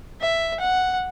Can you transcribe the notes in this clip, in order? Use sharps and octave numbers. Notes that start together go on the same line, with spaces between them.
E5
F#5